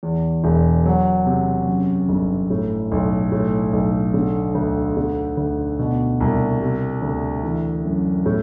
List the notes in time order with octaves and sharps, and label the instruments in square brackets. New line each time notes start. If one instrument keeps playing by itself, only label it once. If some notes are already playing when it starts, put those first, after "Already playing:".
[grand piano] E2
E1
F#3
C3
F#2
G1
A2
B1
A2
B1
D3
D2
D3
D2
B2
C2
C3
D2
E3
F#2
A2